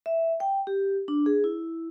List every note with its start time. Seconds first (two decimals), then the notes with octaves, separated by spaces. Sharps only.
0.06 E5
0.40 G5
0.67 G4
1.08 D4
1.26 G#4
1.44 E4